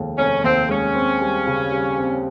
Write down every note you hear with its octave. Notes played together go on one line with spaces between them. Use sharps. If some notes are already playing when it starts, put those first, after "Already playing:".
Already playing: F1 D#2 G#3
F1 C#4
D#2 C4
G#3 C#4
C4
G3
C#3
G3
C4